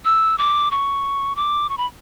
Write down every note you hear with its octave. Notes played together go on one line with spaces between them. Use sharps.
E6
D6
C#6
D6
C#6
B5